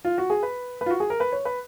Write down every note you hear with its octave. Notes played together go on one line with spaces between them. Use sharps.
F4
F#4
G#4
B4
B4
F4
F#4
G#4
A#4
B4
C#5
B4